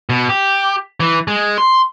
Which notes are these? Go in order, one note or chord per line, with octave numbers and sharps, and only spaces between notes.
B2
G4
E3
G#3
C6